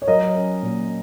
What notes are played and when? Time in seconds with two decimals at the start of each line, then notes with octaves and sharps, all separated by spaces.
0.02 C#5
0.07 F#3 A#4 D#5
0.35 C#4
0.63 A#2